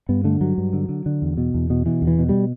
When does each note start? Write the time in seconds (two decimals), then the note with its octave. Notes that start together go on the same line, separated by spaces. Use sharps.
0.09 G2 B3
0.24 D3 A3
0.41 G2 F#3
0.58 G2
0.73 D3
0.89 D3
1.06 D3
1.22 E2
1.37 B2
1.54 E2
1.70 B2
1.86 B2 E3
2.02 E2
2.07 E3
2.19 B2
2.29 G3